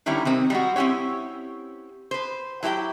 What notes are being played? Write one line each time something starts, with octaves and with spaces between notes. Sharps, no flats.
D3 D#3 G3 C#4 E4 A#5
C3 D#3 C4
G3 G#3 F#4
C4 C#4 E4 G4 C#5
B4 C5
F#3 E4 G4 B4 G5